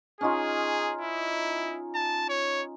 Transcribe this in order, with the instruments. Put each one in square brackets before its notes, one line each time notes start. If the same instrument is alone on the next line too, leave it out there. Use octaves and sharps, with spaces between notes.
[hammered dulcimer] C#4 D#4 F4 [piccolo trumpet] G#4
[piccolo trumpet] E4
A5
C#5